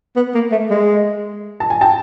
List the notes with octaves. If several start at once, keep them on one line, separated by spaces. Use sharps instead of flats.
B3
A#3
A3
G#3
A5
G#5
G5 A5